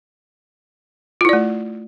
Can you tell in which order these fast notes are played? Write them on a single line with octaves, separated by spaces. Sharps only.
F4 E4 D5 A3